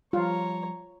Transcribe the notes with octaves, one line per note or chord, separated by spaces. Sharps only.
F3 G3 F4 C#5 A#5